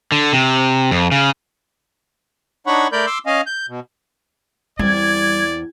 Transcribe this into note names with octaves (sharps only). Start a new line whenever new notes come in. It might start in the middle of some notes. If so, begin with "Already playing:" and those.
D3
C3
F2
C#3
D4 D#4 C#5 F#5 B5 C#6
A3 A#4 D5 B5 G6
C6 D6 E6
C#4 D#5 F5 G#5
G6
B2
E2 G3 C4 D5 G#6